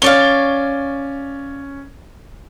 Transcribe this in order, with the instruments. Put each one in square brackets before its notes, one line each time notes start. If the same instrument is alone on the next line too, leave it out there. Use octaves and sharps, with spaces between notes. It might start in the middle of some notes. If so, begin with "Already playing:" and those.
[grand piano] C#4 G7 [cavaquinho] C#5 D5 F5